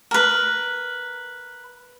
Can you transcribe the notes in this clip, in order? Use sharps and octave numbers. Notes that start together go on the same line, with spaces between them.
A#4 B4